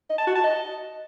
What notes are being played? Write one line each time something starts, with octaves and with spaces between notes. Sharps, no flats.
D#5
A5
F#4
A5
D#5